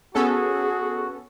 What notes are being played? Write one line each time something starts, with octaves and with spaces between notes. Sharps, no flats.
B3 C#4 F#4 G#4 A4